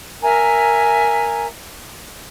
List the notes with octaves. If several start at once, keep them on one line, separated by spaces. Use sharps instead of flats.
A#4 E5 G#5 A#5